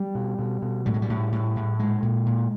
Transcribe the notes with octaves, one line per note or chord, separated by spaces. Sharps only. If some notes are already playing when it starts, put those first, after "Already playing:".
Already playing: G3
B2
B2
B2
A2 G3
G#3
G3
A2
A2
A2
A#2 G#3
A#2
A#2